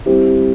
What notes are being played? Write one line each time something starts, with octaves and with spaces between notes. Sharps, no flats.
G3 C4 E4 G4